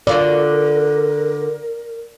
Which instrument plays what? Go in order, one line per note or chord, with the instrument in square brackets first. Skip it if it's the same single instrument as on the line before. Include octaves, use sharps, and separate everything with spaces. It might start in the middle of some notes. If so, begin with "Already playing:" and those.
[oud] D3 F4 F#4 [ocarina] A#4 [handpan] D5